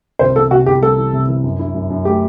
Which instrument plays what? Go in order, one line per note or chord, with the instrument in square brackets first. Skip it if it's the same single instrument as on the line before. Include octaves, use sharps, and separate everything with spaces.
[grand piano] C2 [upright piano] C5
[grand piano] E3 [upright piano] A4
[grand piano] C3 [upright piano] F#4
[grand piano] C2 [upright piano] G4
[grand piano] G3 [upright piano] A4
[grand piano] E3
C3
E3
F#2
E4
F#2
F#2
[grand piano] A3 [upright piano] G4